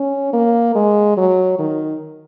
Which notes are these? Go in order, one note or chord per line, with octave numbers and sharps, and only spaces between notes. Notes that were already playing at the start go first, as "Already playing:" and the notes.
Already playing: C#4
A#3
G#3
F#3
D#3